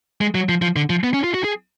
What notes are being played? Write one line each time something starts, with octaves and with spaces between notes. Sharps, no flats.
G#3
F#3
F3
F3
D3
F3
B3
C#4
F4
F#4
G#4